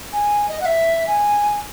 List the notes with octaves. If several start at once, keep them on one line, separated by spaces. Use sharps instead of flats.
G#5
D#5
F#5
E5
G#5